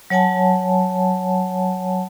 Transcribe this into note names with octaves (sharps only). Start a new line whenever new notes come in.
F#3 C#5 F#5 G#5 A5